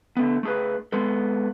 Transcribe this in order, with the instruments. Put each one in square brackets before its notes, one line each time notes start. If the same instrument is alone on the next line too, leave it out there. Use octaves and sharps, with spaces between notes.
[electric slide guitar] D3 A3 B3
A3 G#4 B4
G#3 B3 A4